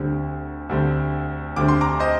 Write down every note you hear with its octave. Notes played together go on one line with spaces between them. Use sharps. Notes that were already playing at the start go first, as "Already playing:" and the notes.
Already playing: D2 D3 G3 C4
D2 D3 G3 C4
D2 D3 G3 C4 D6
C6
A#5 D6
C5 D#5